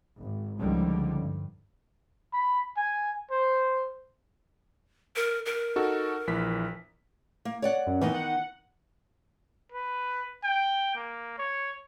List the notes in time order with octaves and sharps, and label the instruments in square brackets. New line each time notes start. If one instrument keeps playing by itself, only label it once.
[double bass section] G#1
C#2 D3 D#3 F3 G3
G2
[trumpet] B5
G#5
C5
[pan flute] A#4
A#4
[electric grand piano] D#4 F#4 A4
A#1 E3 B6
[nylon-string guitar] A#3
C#5 D5 F#5
[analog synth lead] F#2
[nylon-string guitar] D#3 B3 D#4 [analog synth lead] E3
[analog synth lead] F#5
[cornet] B4
G5
A#3
C#5